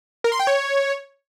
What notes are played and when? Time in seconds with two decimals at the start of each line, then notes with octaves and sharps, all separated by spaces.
0.24 A#4
0.32 C6
0.40 G5
0.47 C#5